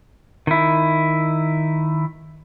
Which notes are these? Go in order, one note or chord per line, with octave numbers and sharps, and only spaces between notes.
D#3 E4